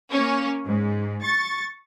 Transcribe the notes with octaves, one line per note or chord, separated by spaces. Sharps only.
A#3 C#4
G#2
C#6 A6